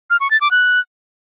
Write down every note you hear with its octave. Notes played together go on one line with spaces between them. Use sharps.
F6
C#6
A6
D6
F#6